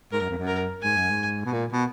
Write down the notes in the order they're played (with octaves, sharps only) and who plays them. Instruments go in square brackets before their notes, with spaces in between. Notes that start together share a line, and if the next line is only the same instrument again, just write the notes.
[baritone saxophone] G#2 [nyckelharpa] A#4
[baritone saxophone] F#2
F2
F#2
[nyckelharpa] A#4
[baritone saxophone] G#2 [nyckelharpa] G#5
[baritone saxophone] F#2
G#2
B2
A#2
B2